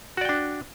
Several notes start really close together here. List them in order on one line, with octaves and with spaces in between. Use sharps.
F#4 D5 G5 D4